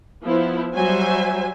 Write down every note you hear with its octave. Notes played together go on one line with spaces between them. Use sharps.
F3 B3 E4
F#3 G3 C5 E5 G#5